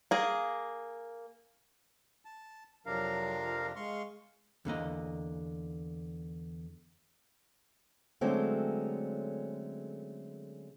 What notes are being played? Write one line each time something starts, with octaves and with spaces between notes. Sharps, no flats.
A#3 G#4
A5
F2 C3 F#3 D4 A#4 F5
F3
G#3 F5 C6 C#6
E2 D3 A#3 D#5
D3 F#3 G#3 A3 C4 C#4